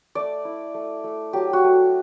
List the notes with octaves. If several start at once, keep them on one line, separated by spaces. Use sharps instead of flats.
A3 D5
E4
A3
A3
F#3 G4
F#4
A3